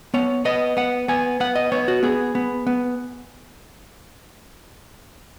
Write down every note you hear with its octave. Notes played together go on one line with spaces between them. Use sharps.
B3 C#5
B3 D#5
B3 F#5
B3 G#5
B3 F#5
D#5
B3 C#5
F#4
B3 G#4
B3
B3